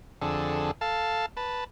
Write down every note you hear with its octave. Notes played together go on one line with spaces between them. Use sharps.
F2 D3 G#4 A4
A4 F5 A5
B4 A5